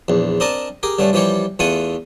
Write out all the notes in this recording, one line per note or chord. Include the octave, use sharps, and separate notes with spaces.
A#1 E2
C4 D4 A#4 D#5 A5
G4 G#4 A#4
G2 D3 A3 C#4
E3 F3 G3 G4 C#5
E2 A3 F4 F#5 G#5 D#6